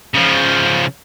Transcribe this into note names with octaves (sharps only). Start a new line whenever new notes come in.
C#3 F3